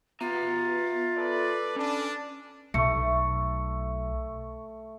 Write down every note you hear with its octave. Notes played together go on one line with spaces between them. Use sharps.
B3 F4 E5 A#5
A4 B4 D5
C#4 D4
B1 A3 C#6 C#7